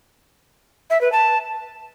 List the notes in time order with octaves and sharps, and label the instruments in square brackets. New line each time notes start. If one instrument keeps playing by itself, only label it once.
[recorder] E5
B4
A5